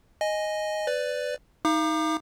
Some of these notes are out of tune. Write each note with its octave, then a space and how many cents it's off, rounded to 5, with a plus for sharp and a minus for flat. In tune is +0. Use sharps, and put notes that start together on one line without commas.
D#5 +0 G#5 +0
B4 +20 D5 +0
D#4 +20 F5 -35 D6 +40